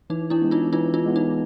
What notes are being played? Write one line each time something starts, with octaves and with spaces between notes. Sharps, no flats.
E3 D#4
D4 E4
G#3 B3
D#4 F4
E3 D#4 F4
D#4 F4
G#3 B3
D#4